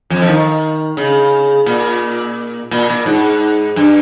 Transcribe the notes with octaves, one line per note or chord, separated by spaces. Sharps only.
F2
F3
D#3
C#3
A#2
A#2
A#2
G#2
G2